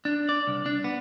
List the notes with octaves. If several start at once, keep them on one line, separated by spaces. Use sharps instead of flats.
D4
D5
C2
D4
B3